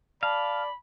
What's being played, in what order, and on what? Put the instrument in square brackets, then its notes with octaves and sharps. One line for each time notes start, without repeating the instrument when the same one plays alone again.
[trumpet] D5 [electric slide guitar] F5 [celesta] A5 [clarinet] B5